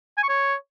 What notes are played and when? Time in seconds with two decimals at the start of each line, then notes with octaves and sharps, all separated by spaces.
0.17 G#5
0.23 C#6
0.29 C#5